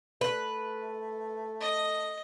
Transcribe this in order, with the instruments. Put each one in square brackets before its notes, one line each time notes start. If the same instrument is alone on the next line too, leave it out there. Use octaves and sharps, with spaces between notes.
[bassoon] A3 [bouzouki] B4
[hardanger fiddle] D#5